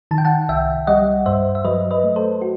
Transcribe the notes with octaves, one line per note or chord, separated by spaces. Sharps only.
D#3 A5
G5
F#5 A5
C2 E5 G5
G3 D#5 F#5
G2 C5 E5
E5
F#3 B4 D#5
B4 D#5
A3
A4 C5
F#4